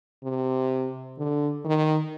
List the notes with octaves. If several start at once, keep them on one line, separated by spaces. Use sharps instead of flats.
C3
D3
D#3